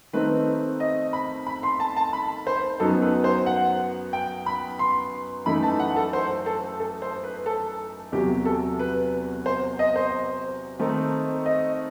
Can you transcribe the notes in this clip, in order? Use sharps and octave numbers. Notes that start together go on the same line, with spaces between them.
D#3 A3 C4 D#4 B4
D#5
B5
B5
C6
A5
A5
B5
C5
F#2 F#3 B3 D#4 A4
B4
C5
F#5
G5
B5
C6
F#2 E3 A3 D#4 B5
A5
F#5
A4
C5
A4
A4
C5
B4
A4
E2 C3 F#3 G4
A4
B4
C5
D#5
C5
D#3 A3 C4 D#4
D#5